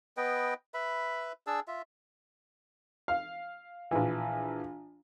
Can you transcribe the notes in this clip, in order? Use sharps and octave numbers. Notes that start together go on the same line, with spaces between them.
B3 B4 D#5 G5
B4 E5 B5
D4 G#4 A5 E6
F4 E5
F5
A#1 E3